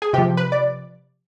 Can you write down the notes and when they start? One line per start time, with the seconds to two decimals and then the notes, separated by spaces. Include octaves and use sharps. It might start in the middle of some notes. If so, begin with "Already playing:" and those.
0.02 G#4
0.13 C3 F3 G4
0.37 B4
0.52 D5